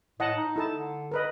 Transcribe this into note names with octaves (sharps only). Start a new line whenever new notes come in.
A2 D#5 F#5 A5
D#4
E4 A4 A5
D3
A#4 B4 D#5